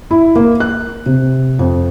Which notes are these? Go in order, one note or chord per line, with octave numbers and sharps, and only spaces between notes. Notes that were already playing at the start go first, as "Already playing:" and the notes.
E4
A#3
F#6
C3
F2